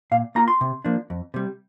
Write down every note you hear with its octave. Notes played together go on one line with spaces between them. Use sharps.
A#2 F5
A#3 F4 A#5
C6
C3
F3 A#3 D4
F2
C3 G3